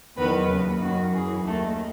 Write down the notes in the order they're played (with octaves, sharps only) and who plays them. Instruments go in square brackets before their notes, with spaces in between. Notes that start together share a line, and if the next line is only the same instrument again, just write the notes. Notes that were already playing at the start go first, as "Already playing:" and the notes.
[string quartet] E2 D#3 F#3 B3 B4
D#2 C#3 F#3
F#2 D#3 F#3 F#4
F#2 E3 G#4
D#2 D#3 F#3 A3 A4